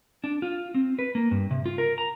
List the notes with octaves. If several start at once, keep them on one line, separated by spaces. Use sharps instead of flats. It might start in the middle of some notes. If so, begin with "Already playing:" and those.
D4
F4
C4
B4
A#3
G2
C3
F4
A#4
A#5